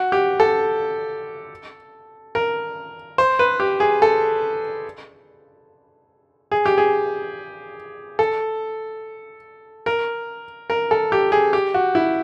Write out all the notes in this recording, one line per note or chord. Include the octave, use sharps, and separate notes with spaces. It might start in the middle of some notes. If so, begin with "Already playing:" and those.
Already playing: F#4
G4
A4
A#4
C5
B4
G4
G#4
A4
G#4
G4
G#4
A4
A#4
A#4
A4
G4
G#4
G4
F#4
E4